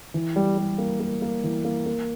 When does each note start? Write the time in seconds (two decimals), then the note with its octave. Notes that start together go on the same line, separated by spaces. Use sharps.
0.14 E3
0.36 G3
0.58 G3
0.78 A#3
1.00 A#3
1.22 A#3
1.44 E3
1.65 A#3
1.86 A#3